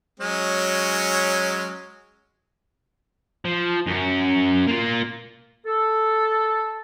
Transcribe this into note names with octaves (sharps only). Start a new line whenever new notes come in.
F#3 G#3 C#4
F3
F#2 C#4
A#3 F4
A4